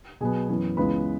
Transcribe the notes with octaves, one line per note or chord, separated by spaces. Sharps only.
B2 F#3 B3 G#4 G#5
F#2 E3 B3
C#2 C#3 E3 G#3 B3 B4 B5